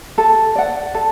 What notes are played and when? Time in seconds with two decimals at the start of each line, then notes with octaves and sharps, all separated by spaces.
0.18 A4
0.55 D5 F#5
0.94 A4